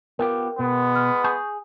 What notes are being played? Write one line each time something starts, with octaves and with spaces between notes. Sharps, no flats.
B3 F4 G4 A#4 G5
B2 G#3 B3
F6
G#4 C#6 G6